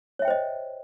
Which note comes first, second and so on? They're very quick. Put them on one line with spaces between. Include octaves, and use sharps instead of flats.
C#5 E5 G5 C5 D#5